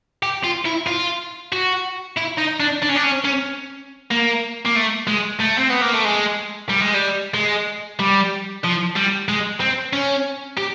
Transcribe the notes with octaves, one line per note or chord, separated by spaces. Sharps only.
G4
F4
E4
F4
F#4
E4
D#4
D4
D4
C#4
D4
C#4
C#4
A#3
A#3
A3
G#3
A3
C4
B3
A#3
A3
G#3
G3
G#3
G3
G#3
G3
F3
G3
G#3
C4
C#4
G4